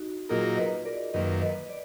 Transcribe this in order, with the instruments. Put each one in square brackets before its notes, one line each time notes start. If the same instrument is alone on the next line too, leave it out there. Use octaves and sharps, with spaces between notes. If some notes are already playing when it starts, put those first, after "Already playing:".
Already playing: [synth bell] D#4 F#4
[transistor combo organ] A#2 F#3 A#3 D#4 A#4 [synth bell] F4 G#4
[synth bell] B4 D#5
A#4 D5
[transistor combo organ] F#2 D#3 A#3 [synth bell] B4 D#5
[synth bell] B4 D#5
D5